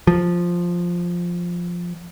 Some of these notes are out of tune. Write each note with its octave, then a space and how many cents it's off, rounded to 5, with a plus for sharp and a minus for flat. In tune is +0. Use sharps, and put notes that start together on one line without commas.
F3 +0